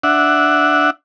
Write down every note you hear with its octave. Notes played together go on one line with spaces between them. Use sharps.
D4 E5 F#5